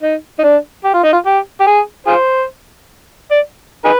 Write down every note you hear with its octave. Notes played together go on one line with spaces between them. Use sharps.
D#4
D#4
D4
G4
F4
D#4
F4
G4
G4
G#4
F4 G#4 C5
D5
D#4 G#4 B4